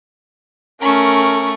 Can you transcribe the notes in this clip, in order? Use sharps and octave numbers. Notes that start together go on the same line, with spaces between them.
A3 C#4 A#4 C#6